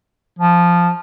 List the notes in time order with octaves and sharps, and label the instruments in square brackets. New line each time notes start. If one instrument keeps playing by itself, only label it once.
[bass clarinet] F3